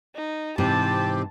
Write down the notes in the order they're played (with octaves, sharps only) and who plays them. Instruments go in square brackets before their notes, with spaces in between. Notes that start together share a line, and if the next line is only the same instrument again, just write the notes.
[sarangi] D#4
[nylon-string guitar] G#2 C3 E3 [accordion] C4 G4 [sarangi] A5